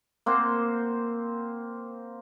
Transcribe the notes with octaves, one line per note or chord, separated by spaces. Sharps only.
A#3 C4 C5 F#5